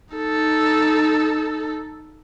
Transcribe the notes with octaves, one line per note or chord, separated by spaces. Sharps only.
D#4 A4